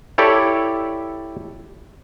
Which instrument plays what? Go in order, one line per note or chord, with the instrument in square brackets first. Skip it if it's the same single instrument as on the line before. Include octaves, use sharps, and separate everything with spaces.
[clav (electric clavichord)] E4 G4 A4 C#5 D5